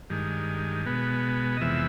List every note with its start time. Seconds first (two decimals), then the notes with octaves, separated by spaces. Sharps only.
0.10 G2 D#3 G#3
0.86 B2 G#3 B3
1.57 D#5
1.61 F2 C3 E3 G#3 B3 E5